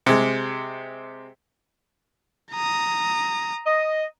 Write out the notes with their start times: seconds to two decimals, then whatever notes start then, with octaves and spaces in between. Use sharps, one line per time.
0.06 C3 G#3
2.52 A#5 D#6
3.66 D#5